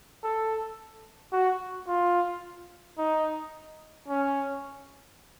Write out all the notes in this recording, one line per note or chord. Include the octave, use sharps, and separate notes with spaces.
A4
F#4
F4
D#4
C#4